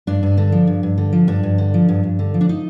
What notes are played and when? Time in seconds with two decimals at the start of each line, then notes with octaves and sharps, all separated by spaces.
0.07 G2 D4
0.23 G2
0.37 D3
0.52 F3
0.67 G2
0.83 G2
0.98 D3
1.13 F3
1.27 G2 D4
1.43 G2
1.58 D3
1.74 F3
1.89 G2
2.03 G2
2.19 D3
2.34 F3
2.41 D4
2.49 D#4